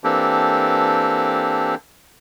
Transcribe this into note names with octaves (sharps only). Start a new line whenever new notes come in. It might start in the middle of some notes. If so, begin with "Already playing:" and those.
E3 A#3 C4 D4 G4 A4